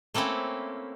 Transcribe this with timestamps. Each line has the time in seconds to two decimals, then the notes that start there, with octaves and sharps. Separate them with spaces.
0.14 A3 A#3 C4 C#4 E4